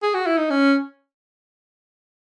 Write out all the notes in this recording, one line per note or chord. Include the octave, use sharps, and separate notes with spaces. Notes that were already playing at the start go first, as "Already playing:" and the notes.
G#4
F#4
E4
D#4
C#4